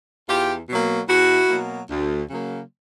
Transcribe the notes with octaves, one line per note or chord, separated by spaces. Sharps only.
E2 F4 G4
B2 F#3 A#3
E2 E4 F#4
B2 F#3 A#3
D2
C#3 F#3 A#3